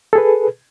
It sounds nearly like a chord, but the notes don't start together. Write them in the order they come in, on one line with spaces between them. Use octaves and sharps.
A4 G#4 B4